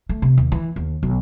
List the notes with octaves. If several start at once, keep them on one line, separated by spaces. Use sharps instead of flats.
A3
C3
D#2
E3
D#2
B1